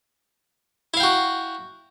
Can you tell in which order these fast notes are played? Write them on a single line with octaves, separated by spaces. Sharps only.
E4 F5 G5 F#4